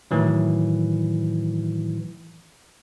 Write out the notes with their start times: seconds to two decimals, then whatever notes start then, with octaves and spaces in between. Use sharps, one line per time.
0.11 A2 D#3 E3 F#3